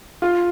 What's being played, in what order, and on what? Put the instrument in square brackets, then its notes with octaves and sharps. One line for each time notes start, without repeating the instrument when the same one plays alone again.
[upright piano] F4